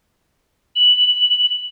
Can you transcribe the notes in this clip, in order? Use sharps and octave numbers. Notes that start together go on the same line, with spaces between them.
F#7